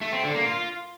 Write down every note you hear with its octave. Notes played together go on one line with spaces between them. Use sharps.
A3
C4
D3
A#3
F4